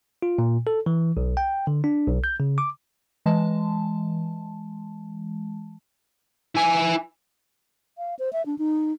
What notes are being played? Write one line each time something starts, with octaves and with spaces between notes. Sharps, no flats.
F4
A#2
A4
E3
B1
G5
D3
D4
B1
G6
C#3
D6
E3 G#3 A5
E4 G#5
F5
C5
E5
D4
D#4